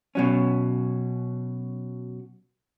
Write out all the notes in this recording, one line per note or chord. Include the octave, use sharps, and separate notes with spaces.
B2 F#3 C#4